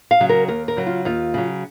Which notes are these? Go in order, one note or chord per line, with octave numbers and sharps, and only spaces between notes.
F5
C#3 F#3
A#4
D#2 A#4
A#4
C#3 F#3
F4
D#2 F4
C#3 F#3